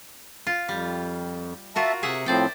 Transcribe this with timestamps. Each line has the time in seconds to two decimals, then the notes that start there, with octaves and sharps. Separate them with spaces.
0.47 F4
0.69 F2 G3
1.76 F4 F#4 A#4 E5 A5
2.03 C3 G#4 E5 F#5
2.26 A2 F3 C4 C5 D5 G5